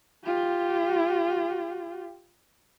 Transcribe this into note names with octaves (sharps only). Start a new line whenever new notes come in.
F4 G4